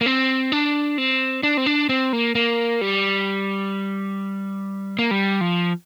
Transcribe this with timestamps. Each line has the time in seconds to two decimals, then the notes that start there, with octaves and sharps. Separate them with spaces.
0.01 A#3
0.06 C4
0.52 D4
0.98 C4
1.43 D4
1.57 C4
1.66 D4
1.89 C4
2.13 A#3
2.35 A#3
2.81 G3
4.99 A#3
5.11 G3
5.41 F3